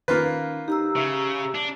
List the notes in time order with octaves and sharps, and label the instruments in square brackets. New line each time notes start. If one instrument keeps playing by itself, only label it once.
[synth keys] D#3 C#4 D#4 [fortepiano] A#3 F4 B4
[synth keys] D#4 [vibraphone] G4 A#5 E6
[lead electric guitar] C#3 [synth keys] E5
[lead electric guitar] D4